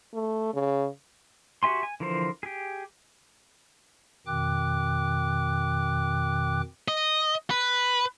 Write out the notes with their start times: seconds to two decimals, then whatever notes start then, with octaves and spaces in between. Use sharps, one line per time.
0.14 A3
0.54 C#3
1.63 F#4 G4 E5 G#5 C6
1.83 G#5
2.00 D3 E3 F3 A#4 C5
2.43 G4 G#4
4.27 F2 B2 D#3 G5 D6 F#6
6.88 D#5
7.50 B4